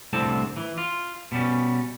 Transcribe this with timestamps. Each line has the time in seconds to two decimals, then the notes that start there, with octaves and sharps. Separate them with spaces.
0.13 C2 A2 D3 C4 A5
0.57 E3
0.78 F4
1.32 B2 G3 C#4